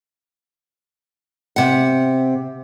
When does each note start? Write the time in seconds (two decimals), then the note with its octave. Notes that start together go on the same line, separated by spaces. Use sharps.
1.56 C3 F#5